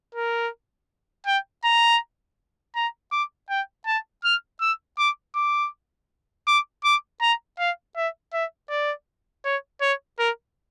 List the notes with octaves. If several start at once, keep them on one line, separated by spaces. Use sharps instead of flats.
A#4
G5
A#5
A#5
D6
G5
A5
F6
E6
D6
D6
D6
D6
A#5
F5
E5
E5
D5
C#5
C#5
A#4